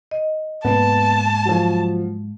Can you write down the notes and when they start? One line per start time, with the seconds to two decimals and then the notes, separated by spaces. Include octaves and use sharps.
0.11 D#5
0.64 G#2 A#3 B3 A5
1.45 F3 F#3